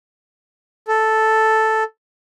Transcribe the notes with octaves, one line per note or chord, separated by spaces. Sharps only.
A4